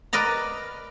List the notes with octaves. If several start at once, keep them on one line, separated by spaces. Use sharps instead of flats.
A#4 B4 D5 D#5 A#5